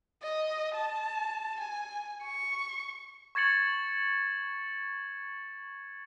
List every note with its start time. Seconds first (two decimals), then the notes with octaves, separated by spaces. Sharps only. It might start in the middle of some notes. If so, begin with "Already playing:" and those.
0.22 D#5
0.75 A5
1.60 G#5
2.22 C#6
3.35 C#6 G#6 A6 C#7 F#7